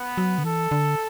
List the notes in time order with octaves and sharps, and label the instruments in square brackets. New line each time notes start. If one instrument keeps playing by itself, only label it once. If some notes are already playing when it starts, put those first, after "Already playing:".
Already playing: [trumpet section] B3
[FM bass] F#3
D3
[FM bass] E3 [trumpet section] A4
[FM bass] D3